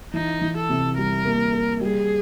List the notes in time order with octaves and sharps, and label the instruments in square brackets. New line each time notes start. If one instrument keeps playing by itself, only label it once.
[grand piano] E3 [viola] D#4
[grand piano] E3
[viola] A4
[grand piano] C3
[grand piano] G3 [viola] A#4
[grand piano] A#3
A#3
[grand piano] G3 [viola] G#4